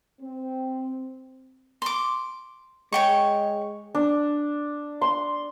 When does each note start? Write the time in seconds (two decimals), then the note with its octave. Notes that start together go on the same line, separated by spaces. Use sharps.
0.21 C4
1.82 C6 D6
2.92 G#3 C#5 G5 C#6
3.95 D4
5.01 C6